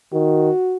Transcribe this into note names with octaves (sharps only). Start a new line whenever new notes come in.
D#3 F#4